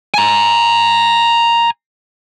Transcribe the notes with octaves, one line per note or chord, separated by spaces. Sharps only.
G#5 A#5